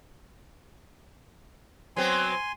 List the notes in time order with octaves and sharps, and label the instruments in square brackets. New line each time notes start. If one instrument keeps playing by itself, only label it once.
[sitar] F#3 B3 C4 [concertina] G#5 C6